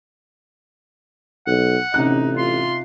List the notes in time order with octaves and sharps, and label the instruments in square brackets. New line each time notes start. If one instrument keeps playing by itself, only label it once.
[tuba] B1 [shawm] F#5
[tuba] A1 [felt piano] C3 C#4 F#6 [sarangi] D#4
[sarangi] F4 [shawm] C6